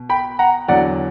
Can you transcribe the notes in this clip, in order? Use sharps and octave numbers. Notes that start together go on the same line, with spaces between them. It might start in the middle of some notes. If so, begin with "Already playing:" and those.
Already playing: B2
G5 B5
F#5 A#5
E2 D3 F#3 D5 F#5